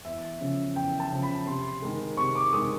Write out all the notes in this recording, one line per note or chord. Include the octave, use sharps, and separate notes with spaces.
E2 E5
C#3 F3
E2 G5
A5
C#3 F3
B5
C3 C6
D#3 G#3
C3 C#6
D6
D#3 G#3 D#6